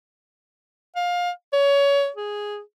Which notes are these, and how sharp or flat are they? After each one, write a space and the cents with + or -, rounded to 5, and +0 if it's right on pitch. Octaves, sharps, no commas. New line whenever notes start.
F5 +20
C#5 +25
G#4 +0